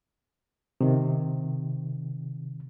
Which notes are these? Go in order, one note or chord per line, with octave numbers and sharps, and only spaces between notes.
C3 D#3